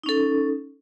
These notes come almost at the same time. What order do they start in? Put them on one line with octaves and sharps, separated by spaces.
D#4 C#4 A4